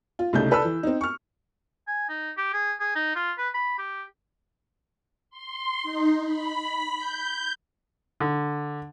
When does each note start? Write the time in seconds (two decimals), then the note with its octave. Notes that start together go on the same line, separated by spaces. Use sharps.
0.19 F4
0.33 C2 C#3 A3 D#4 G6
0.51 A4 B4 D5 A5 E6
0.65 E3
0.83 C4 D#4
1.01 C#6 F6
1.87 G#5
2.09 D#4
2.37 G4
2.53 G#4
2.80 G#4
2.95 D#4
3.15 F4
3.38 B4
3.54 B5
3.78 G4
5.30 C6
5.83 D#4
6.23 B5
6.97 G6
8.20 D3